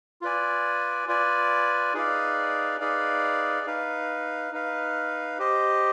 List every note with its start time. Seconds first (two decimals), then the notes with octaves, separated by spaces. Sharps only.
0.22 F4 B4 D5 G#5
1.08 F4 B4 D5 G#5
1.94 D#4 G#4 B4 D5 F5
2.80 D#4 G#4 B4 D5 F5
3.67 D#4 B4 F5
4.53 D#4 B4 F5
5.39 G4 C5 D#5